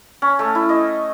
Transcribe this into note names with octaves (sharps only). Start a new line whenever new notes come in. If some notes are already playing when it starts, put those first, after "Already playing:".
C#4
A3
E4
D#5